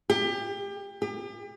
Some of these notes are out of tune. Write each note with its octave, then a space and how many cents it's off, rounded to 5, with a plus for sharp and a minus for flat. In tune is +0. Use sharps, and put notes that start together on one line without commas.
G4 +30
G4 +40